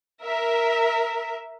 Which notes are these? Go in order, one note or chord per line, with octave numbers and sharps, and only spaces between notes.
A#4 E5